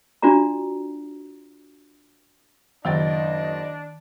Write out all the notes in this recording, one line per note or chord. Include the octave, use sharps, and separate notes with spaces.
D4 F4 F#4 D5 A#5
F#1 D#3 D4 D#5 G5 A6